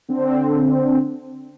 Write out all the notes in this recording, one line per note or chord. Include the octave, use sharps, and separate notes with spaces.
D3 C4